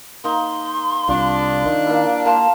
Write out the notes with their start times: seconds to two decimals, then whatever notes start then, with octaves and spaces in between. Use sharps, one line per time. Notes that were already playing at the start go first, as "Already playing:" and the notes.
0.24 A#3 D#4 C6
1.08 C2 D4 F4
1.66 D#3
1.86 A#3 E4
2.26 A#3 G4 F5 A5 C6